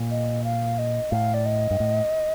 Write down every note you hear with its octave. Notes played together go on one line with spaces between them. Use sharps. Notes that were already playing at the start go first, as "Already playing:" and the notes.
Already playing: A#2
D#5
F5
D#5
A2 F5
D5
D#5
G2
A2